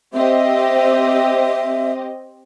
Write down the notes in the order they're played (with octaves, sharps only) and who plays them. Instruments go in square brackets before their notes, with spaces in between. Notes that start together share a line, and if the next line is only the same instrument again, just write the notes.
[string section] C4 G4 D#5 [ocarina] E5